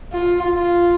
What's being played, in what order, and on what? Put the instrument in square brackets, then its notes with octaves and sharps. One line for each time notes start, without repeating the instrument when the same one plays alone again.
[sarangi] F4
F4